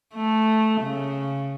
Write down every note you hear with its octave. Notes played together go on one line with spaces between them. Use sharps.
A3
C#3